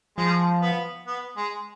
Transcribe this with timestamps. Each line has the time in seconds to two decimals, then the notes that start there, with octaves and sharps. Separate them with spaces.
0.18 F3 G#3
0.62 B3
1.07 B3
1.37 G#3